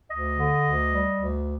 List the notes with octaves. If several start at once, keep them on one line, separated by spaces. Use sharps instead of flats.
D2 D#5
D3
D2
G3
D2